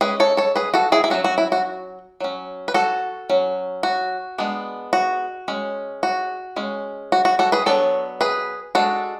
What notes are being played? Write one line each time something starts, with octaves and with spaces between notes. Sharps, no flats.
G#3 C#4 G#4 B4
A4 C#5
A4 C#5
G#4 B4
F#4 A4
E4 G#4
E4
F#3 C#4 F#4
F#4
E4
F#4
F#3 C#4
B4
F#4 A4
F#3 C#4
F#4
G#3 B3 D4
F#4
G#3 C#4
F#4
G#3 C#4
F#4
F#4
F#4 A4
G#4 B4
F#3 B3 D4 A4 C#5
G#4 B4
G#3 D4 F#4 A4